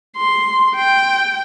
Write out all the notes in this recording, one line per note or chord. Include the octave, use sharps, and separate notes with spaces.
C6
G5